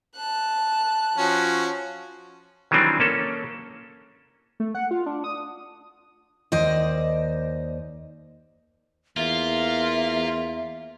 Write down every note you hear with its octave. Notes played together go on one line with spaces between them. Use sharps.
A5 F#6
F3 C#4 F#4
D#3 E3 F#3 G3 C4 D4
A#3 C#4 A4
A3
F#5
F4
D4
D#6
D#2 C5 D5 D#5
E2 A#3 F4 E5